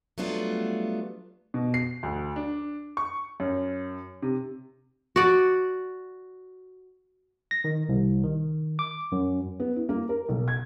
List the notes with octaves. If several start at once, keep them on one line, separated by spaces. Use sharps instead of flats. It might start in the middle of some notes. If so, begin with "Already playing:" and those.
F#3 G3 A3 B3 D4 F4
B2
C7
D2
D4
C#6
F#2
C3
F#4 D5
A#6
D#3
C2
D#3
D6
F#2
B3
E4
A#3
A#4
B1
G#6